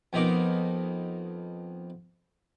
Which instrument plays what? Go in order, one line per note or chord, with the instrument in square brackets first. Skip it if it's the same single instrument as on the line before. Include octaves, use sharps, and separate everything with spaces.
[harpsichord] F2 B3 D#4 A#4 D6